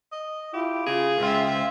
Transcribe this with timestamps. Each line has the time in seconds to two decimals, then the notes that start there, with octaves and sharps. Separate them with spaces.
0.12 D#5
0.53 E4 F4 G4
0.86 C#3 F4 G#4
1.20 C#2 F4 C5 E5 F5 G5